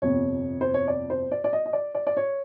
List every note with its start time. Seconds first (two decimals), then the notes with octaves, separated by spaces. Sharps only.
0.02 G1 F2 C3 C#5
0.61 C5
0.74 C#5
0.88 D5
1.10 C5
1.32 D5
1.44 D5
1.53 D#5
1.66 D#5
1.73 D5
1.95 D5
2.07 D5
2.17 C#5